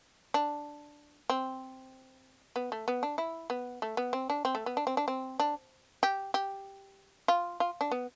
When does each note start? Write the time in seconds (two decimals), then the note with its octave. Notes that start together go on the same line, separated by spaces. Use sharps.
0.34 D4
1.30 C4
2.56 B3
2.72 A3
2.88 B3
3.03 D4
3.18 E4
3.50 B3
3.82 A3
3.97 B3
4.13 C4
4.30 D4
4.45 C4
4.55 A3
4.66 B3
4.77 D4
4.87 C4
4.97 D4
5.08 C4
5.40 D4
6.03 G4
6.34 G4
7.28 F4
7.60 F4
7.81 D4
7.91 B3